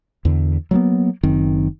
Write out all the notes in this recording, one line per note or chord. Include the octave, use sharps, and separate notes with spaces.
E2 D3
F#3 G#3 A#3 B3
F#1 F#2 D#3 C4